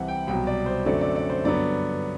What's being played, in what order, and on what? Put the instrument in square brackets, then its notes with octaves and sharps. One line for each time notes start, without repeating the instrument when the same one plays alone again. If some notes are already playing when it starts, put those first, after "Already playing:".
Already playing: [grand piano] C2 C3 E3 F#5
G5
C2 B2 F#3 G5
D5
C5
F#2 D3 F#3 A3 C4 D5
D5
D5
C5
G2 D3 F#3 B3 D5